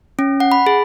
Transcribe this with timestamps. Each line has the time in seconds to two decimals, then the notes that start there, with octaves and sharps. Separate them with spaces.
0.19 C#4
0.40 F#5
0.52 B5
0.66 G#4